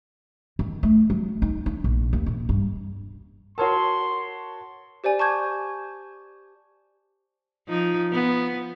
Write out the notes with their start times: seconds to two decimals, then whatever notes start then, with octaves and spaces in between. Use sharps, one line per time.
0.59 D#3
0.83 A3
1.10 F#3
1.42 D#4
1.66 D4
1.84 A#1
2.13 D#2
2.26 A#2
2.49 G2
3.58 F#4 A#4 B4 C#5 A5 A#5 C6
5.04 G4 C5 D5 G#5
5.19 A5 C#6 D6 G6 G#6
7.68 F3 D#4
8.12 F3 B3